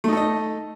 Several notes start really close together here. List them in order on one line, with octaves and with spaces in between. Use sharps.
A3 D#4 A4 D#5